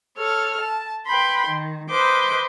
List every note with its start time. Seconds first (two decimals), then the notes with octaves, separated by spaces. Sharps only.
0.17 A4 C#5 F6
0.60 A5
1.06 B4 G5 B5 C6
1.45 D#3
1.89 B4 C5 D#5 D6 G6